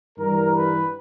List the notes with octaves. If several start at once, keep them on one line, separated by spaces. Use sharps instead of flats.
G2 E3 G3 A#4
B4